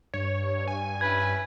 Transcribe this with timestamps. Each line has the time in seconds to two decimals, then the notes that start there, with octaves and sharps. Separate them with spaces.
0.14 G2 C#5
0.68 G#5
1.01 C#4 E4 B4 G#6